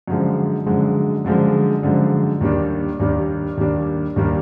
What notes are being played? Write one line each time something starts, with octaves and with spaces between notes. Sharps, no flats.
F#2 D3 F3 G#3
F#2 D3 F3 G#3
F#2 D3 F3 G#3
F#2 D3 F3 G#3
D#2 D#3 G3 A#3 D4
D#2 D#3 G3 A#3 D4
D#2 D#3 G3 A#3 D4
D#2 D#3 G3 A#3 D4